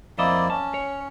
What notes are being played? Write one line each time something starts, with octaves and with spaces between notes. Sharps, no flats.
F2 A#3 E4 C5 D5 D#5
C#4 A5
C#5